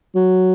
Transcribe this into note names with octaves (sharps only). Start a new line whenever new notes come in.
F#3